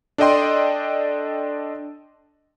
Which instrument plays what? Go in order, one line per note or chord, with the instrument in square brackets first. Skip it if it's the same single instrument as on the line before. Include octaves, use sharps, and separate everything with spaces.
[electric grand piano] D4 A4 D5 D#5 G5 C6